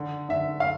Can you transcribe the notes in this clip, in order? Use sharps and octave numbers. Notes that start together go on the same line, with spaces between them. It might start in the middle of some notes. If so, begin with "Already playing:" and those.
Already playing: D3
D3 E5
F5